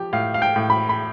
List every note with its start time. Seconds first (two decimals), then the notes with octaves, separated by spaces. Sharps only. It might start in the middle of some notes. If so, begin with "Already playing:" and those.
Already playing: F3 G4
0.13 A2 F5
0.34 F5
0.42 G5
0.56 A2
0.70 B5
0.89 B5